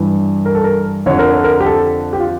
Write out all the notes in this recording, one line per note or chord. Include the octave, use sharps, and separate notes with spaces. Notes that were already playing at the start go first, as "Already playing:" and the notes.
Already playing: G2 E3
A#4
A4
A#4
F2 D3 F3 C#5
A#4
A4
A#4
G4
A4
G4
F4